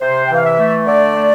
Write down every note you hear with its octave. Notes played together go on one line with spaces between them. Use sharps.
C3 C5
E3 G5
F5
E5
A3
D3 D5
A3